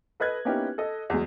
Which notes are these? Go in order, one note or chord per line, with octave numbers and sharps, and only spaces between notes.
A4 B4 D#5 F#6 G#6
A#3 B3 C#4 D#4 E4 G4
A4 D#5
E2 F#3 G#3